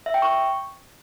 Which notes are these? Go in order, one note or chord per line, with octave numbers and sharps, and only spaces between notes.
E5
G5
C#6